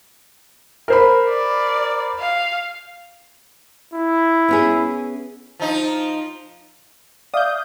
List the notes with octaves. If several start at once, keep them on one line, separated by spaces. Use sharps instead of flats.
A#4 C5 B5
D5
F5
E4
B3 C#4 G#4
F3 D#4
D5 E5 F5 D#6 G6